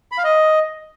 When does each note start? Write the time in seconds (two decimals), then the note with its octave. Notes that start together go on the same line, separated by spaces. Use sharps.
0.12 B5
0.18 F5
0.24 D#5